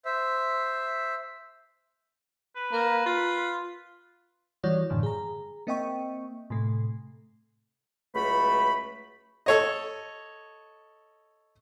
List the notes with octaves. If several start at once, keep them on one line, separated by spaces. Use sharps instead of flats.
C5 E5
B4
A#3
F4
E3 G3 F#4 C#5 D5
F#2 A2 D3 E3
G#4 A#5
A#3 C4 D#5 E5 G5 C#6
A2 C3 A3
C#2 F#3 A3 B4 B5
A4 C#5 D#5